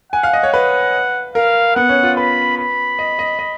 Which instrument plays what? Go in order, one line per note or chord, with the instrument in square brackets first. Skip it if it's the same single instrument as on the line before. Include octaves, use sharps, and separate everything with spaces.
[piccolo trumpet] F#5 [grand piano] G#5
[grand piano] F5
D#5
C#5
[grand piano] B4 [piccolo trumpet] F#5
[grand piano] A#4 [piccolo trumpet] F5
[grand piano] B3 [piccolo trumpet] F#5
[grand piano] C#4
F4
[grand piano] B4 [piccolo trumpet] B5
[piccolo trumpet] B5
[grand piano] D#5
D#5
D#5